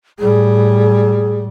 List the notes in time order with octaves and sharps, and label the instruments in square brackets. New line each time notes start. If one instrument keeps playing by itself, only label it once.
[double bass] A2 G3 [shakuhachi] G#4